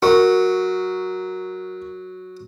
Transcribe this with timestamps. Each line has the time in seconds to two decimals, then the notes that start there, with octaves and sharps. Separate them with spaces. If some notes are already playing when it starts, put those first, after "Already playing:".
0.02 F#3 A#4 C#6